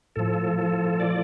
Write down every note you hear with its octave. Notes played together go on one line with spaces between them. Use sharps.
A2 F3 A4
A4
D5